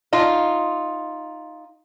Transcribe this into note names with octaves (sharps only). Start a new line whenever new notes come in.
D#4 F4